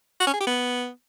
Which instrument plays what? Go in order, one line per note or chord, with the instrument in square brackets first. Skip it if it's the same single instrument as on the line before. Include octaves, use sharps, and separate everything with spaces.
[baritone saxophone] F#4
C#4
G#4
G4
B3